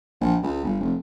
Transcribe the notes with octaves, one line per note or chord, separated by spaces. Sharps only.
A#1
C#2
G1
F1